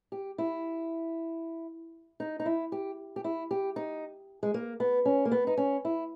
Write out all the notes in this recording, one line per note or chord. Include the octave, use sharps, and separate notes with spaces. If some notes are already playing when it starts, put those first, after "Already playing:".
G4
E4
D#4
D#4
E4
G4
G4
E4
G4
D#4
G#3
A#3
B3
C#4
A#3
B3
D#4
C#4
E4